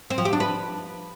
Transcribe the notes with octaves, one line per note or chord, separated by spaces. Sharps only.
C4
F3
G4
D4
B4